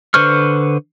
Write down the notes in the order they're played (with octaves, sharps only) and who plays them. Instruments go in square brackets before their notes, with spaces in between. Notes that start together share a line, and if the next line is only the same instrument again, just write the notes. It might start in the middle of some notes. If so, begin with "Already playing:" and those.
[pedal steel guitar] D3 B4 C5 C#6 F6